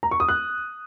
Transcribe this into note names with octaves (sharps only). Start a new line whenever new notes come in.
A#5
C#6
D#6
F#6